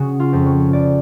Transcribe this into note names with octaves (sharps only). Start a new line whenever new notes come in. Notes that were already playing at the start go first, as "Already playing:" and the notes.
Already playing: C#3 F#4 G#4
F4
F2
C#5
F2 D5